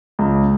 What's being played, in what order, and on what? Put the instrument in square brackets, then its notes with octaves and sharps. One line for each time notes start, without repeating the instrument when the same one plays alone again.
[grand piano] C#2